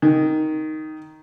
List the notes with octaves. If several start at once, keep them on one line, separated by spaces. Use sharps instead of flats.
D#3